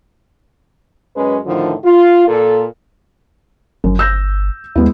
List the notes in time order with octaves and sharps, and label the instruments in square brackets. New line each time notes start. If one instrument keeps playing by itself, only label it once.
[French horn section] F#2 G#3 C#4 B4
A2 D3 D#3 F3
F4
A#2 A4
[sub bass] G1 [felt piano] F#2
[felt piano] E6 G6 A#6
[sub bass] D#2 [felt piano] G#3 B3 E4